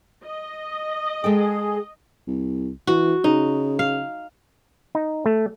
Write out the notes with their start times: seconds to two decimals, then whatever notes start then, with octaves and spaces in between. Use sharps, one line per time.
0.24 D#5
1.24 G#3 G#4 A4 G5
2.27 C2
2.87 E3 F#4
3.24 C#3 D#4
3.79 F5
4.95 D#4
5.26 A3